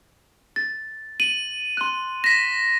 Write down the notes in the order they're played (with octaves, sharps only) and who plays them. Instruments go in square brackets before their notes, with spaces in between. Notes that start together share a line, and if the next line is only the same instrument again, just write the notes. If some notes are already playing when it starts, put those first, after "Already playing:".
[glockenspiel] A6
[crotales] D#7 [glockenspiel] F#7
[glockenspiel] C6 F#6
[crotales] A#6 B6 [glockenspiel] E7